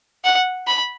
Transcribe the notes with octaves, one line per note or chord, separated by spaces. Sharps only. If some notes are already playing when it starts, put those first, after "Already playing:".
F#5
B5